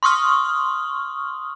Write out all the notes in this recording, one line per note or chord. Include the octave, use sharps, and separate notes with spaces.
C6 C#6 D#6 F6